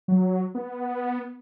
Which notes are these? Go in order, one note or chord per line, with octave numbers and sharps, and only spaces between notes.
F#3
B3